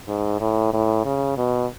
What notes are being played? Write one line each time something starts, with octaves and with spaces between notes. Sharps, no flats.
G#2
A2
A2
C#3
B2